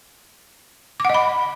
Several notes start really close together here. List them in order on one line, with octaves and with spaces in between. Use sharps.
D6 F#5 D#5 B5